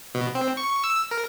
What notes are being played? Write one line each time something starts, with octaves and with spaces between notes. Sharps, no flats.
B2
C4
C#6
E6
A#4